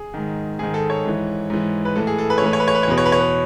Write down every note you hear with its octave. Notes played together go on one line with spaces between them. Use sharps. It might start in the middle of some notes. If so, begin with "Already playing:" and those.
Already playing: G#4
G#2 D#3
G#2 D#3 G#4
A4
C#5
G#2 E3
G#2 E3
B4
A2 E3 A4
G#4
A4
B4
C#5
A2 E3 B4
C#5
B4
C#5
B4
C#5
E2 B2 B4
C#5
B4
C#5
B4